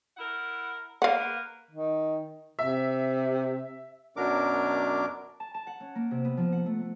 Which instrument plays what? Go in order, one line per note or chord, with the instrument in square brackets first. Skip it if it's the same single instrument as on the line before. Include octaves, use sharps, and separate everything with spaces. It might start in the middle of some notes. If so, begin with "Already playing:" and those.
[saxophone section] E4 A#4 F#5
[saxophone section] A#3 A#4 B4 [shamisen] F5 F#5
[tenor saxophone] D#3
[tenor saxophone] C3 [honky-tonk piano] E5
[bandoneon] F#2 B2 F#3 D4 A#4 D6
[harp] A5
A5
F#5
C#4
A#3
C3
B3
F3
F#5
A3
A3